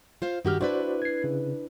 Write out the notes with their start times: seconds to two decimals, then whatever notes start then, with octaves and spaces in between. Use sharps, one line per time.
0.22 F4 C5 F5
0.45 G2 D#3 F#4 G4 F6
0.61 D4 E4 F#4 B4 C5 D5
1.02 G#6 C7
1.24 C#3